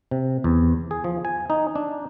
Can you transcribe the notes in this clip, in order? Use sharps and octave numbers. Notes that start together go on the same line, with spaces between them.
C3
E2
G#4
F3
G#5
D#4
D4